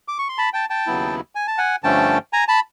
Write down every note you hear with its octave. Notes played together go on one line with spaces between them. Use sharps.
D6
C#6
C6
A5 B5
G5 A5
G5 A5
D#2 C#3 F#3 B3 E4
G#5
A5
F#5 G#5
G2 D3 F3 A3 C#4 G5 A5
G#5 A#5
A5 B5